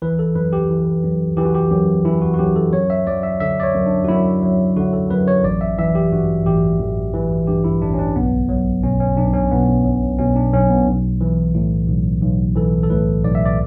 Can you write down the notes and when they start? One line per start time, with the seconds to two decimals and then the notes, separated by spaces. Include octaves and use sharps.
0.02 E3 B4
0.19 A4
0.35 F#2 B4
0.53 G4
0.70 E3
1.03 F#2
1.37 E3 G4
1.45 F#4
1.54 G4
1.71 F#2 G4
2.05 E3 E4
2.22 F#4
2.34 F#4
2.39 F#2 G4
2.56 A4
2.73 F#2 C#5
2.90 E5
3.07 F#3 D5
3.23 E5
3.40 D3 E5
3.60 D5
3.63 C#5
3.75 F#2
3.86 D4
4.04 F#4
4.08 F#2 E4
4.42 F#3
4.76 D3 F#4
4.93 A4
5.10 F#2 B4
5.28 C#5
5.44 A1 D5
5.61 E5
5.78 E3 E5
5.95 G4
6.12 G2 F#4
6.46 A1 G4
6.80 A1
7.14 E3
7.47 G2 G4
7.64 E4
7.82 A1 D4
7.94 C#4
7.99 D4
8.15 B1 B3
8.49 F#3
8.83 B2 C#4
9.00 C#4
9.17 B1 D4
9.34 C#4
9.51 B1 B3
9.84 F#3
10.19 B2 C#4
10.36 D4
10.53 B1 C#4
10.70 B3
10.87 B1
11.21 E3
11.55 A2
11.88 B1
12.22 B1
12.56 E3 A4
12.83 A4
12.90 A2 B4
13.24 B1 D5
13.35 E5
13.45 D5